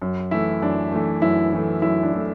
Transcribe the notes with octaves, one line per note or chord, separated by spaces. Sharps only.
F#2
E3 A3 E4
F#2 D4
E3 A3
F#2 E4
E3 A3
F#2 E4
D4
E3 A3